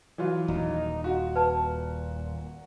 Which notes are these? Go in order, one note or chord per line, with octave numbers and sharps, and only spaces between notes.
E3 F#3 F4
D#1 D#4
F4 F#4
A#2 B4 A5